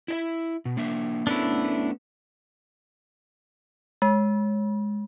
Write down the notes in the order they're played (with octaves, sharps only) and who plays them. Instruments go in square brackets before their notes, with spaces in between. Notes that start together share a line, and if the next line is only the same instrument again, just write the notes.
[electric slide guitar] E4 D#5 E5
B2
A#3 D4 E5
[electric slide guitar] A3 B3 C#4 [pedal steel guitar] D4 E4
[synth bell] G#3